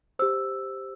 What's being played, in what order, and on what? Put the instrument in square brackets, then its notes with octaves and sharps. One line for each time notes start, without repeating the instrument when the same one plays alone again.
[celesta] G4 C5 E6